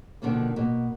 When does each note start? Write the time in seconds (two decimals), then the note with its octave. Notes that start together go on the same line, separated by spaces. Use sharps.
0.22 B2 D3 D#3 F3 A#3
0.56 B2 A#3